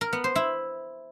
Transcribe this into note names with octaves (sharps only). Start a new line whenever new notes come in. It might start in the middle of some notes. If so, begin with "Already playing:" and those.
A#4
B3
C5
E4